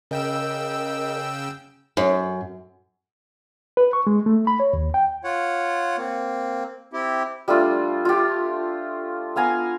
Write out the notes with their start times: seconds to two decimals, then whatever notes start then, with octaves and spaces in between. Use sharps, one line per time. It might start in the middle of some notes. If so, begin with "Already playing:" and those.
0.11 C#3 A#4 D#5 G5 E6
1.97 F#2
3.77 B4
3.93 C#6
4.07 G#3
4.26 A3
4.47 B5
4.60 C#5
4.73 D#2
4.94 G5
5.24 F4 C#5 F#5
5.98 A#3 C4
6.93 C4 E4 G4
7.48 G3 A3 D4 F4
8.05 F4 G4
9.36 B3 F5 G#5 A#5